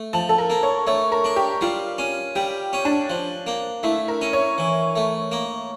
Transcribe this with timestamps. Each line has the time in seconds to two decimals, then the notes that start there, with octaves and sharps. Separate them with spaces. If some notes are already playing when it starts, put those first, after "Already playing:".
Already playing: A3
0.13 F3 A5
0.29 A4
0.38 A#4
0.50 A#3
0.63 C#5
0.87 A3 C#5
1.12 A#4
1.24 D4
1.36 G4
1.61 G3 F4
1.98 C#4
2.35 G3 G4
2.73 C#4
2.85 D4
3.10 F3
3.47 A#3
3.83 A3 E4
4.08 A#4
4.21 C#4
4.33 C#5
4.58 E3
4.96 A3
5.31 A#3